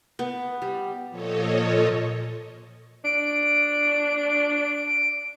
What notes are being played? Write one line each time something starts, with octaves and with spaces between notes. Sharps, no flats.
B3
G3
A#2 F3 A4 C#5 D#5
D4 D7